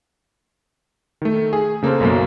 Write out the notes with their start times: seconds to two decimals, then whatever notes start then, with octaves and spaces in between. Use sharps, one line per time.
1.22 D#3 A3
1.53 G#4
1.83 C#3 A#3 A4 A#4 C5
2.00 B1 F#2 A#3